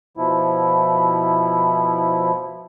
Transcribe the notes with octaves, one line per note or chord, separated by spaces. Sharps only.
B2 F3 E4